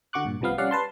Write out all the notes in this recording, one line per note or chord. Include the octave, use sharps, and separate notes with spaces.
D3 F#4 C#6 D6 F#6
G2 A#2
C2 C3 F3 B3 F5
G3 C#4 D5 F5 F#5
B4 A5 C6